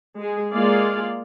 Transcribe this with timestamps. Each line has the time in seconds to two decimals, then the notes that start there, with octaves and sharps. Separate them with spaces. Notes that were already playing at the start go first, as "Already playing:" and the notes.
0.17 G#3 G#4
0.54 G#3 A#3 F4 G#4 D5 F5